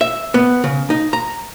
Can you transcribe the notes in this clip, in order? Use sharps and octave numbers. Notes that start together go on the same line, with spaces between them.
E5
B3
C#3
D#4
A#5